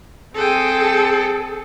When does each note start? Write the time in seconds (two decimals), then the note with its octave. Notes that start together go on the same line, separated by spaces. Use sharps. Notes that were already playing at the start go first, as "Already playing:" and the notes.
0.36 C4 G#4 A4 G5